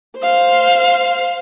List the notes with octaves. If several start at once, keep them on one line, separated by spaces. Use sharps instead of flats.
C5 F5